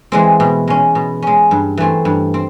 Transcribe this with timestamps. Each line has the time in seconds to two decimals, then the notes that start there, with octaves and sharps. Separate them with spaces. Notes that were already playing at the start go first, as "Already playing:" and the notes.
0.12 E3 G#3 C4
0.40 B2
0.68 G#3 C#4
0.95 B2
1.22 G#3 C#4
1.51 G2
1.78 E3 A3 C4
2.05 G2
2.34 C4